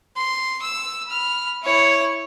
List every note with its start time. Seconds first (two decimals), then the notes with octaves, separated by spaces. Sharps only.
0.17 C6
0.62 E6
1.07 B5 F6
1.63 E4 C#5